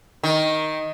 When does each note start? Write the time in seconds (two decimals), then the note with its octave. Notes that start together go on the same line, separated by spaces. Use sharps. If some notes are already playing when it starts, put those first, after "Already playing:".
0.23 D#3